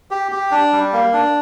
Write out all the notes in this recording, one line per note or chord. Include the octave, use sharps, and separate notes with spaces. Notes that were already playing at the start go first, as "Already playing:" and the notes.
G4
G4
D4
G3
A#3
D4